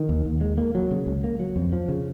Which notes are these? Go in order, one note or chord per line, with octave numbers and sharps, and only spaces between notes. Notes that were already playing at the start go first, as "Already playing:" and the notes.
Already playing: D#3
D#2
D#2
G#3
A#3
F#3
C#3
C#2
A#3
F#3
F2
F3
C#3